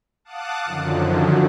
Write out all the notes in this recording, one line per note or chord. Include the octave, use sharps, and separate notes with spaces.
F5 F#5 A5 D6 D#6 F#6
F#2 D3 D#3 F3 F#3